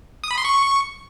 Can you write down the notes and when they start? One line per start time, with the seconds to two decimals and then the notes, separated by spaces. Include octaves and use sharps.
0.24 D#6
0.31 B5
0.38 C6
0.45 C#6